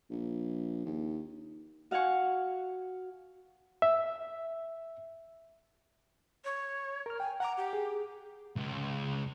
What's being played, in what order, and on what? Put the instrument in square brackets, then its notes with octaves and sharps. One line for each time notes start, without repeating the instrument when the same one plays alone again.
[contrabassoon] A#1
D#2
[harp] F#4 F5 F#5 G#5 C#6
[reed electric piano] E5
[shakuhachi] C#5
[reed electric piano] A#4 F6
[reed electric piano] G5 [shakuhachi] G#5
[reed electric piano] F#5 D6 [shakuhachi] A#5
[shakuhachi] G4
[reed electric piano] G#4
[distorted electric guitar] C#2